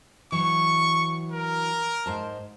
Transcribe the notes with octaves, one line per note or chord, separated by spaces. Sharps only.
E3 F#3 C#6
A#4
G#2 C5 A5